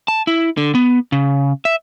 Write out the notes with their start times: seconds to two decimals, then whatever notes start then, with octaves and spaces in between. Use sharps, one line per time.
0.08 A5
0.27 E4
0.57 D3
0.75 B3
1.12 C#3
1.65 E5